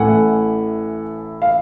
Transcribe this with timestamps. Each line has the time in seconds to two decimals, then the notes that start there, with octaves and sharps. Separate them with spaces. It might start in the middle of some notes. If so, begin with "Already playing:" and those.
Already playing: A1 A2 E3 A3 F#5 G#5
1.42 F5